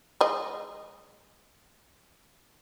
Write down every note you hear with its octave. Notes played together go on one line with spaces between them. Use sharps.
G#3 D#5